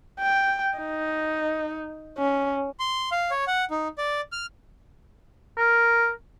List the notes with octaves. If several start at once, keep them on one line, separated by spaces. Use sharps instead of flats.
G5
D#4
C#4
C6
F5
C#5
F#5
D#4
D5
F6
A#4